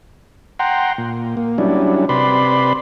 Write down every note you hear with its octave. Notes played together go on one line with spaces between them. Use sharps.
F#5 G5 A#5 C6
A#2
A#3
F#3 G3 C#4 D4 E4
C3 B4 D5 B5 C6